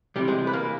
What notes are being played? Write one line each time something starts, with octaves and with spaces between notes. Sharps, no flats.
C3 E3 G3 G4
G#3 G#4
B4
A#3 A#4